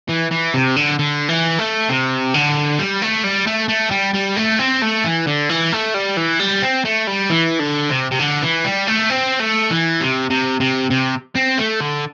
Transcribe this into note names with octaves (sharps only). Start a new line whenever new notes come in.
E3
E3
C3
D3
D3
E3
A3
C3
D3
G3
A3
G3
A3
A3
G3
G3
A3
C4
A3
E3
D3
E3
A3
G3
E3
G3
C4
A3
G3
E3
D3
C3
C3
D3
E3
G3
A3
C4
A3
E3
C3
C3
C3
C3
C4
A3
D3